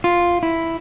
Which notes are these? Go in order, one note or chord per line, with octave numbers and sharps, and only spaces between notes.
F4
E4